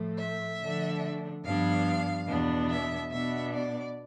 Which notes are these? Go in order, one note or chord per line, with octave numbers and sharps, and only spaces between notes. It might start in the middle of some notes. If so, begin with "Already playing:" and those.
Already playing: A2 F3 A3
E5
D3 F3 A3 D4
G2 F3 B3 D4 F5
E2 B2 B3 D4
E5
B2 B3 D4 E5
D5